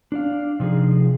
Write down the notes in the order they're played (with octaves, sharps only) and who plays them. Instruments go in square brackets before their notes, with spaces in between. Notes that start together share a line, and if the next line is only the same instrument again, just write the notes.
[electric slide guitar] D4 D5 F5
C3 F3 D#4 G#4